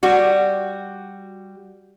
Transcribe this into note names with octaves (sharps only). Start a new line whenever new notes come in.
G3 F#4